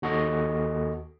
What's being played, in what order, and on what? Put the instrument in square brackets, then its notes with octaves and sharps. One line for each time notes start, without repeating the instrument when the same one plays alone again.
[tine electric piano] D#2 F#4 A4 D#5